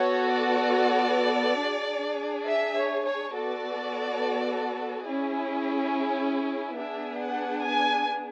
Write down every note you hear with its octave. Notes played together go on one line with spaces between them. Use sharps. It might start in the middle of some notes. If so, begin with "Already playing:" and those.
Already playing: B3 F#4 A4 C#5
D5
D4 G#4
E5
C#5
C#5
B3 F#4 A4 D5
C#4 E4 G#4
B3 D4 G#4 E5
F#5
G#5